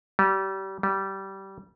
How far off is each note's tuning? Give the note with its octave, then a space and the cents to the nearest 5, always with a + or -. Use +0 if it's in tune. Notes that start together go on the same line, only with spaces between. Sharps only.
G3 -30
G3 -20